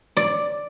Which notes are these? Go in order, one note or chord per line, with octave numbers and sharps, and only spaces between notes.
D5